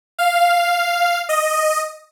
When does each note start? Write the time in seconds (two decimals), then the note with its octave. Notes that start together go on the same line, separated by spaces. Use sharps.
0.19 F5
1.29 D#5